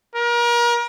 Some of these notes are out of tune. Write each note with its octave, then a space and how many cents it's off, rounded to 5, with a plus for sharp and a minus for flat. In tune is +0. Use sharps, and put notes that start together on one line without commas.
A#4 +35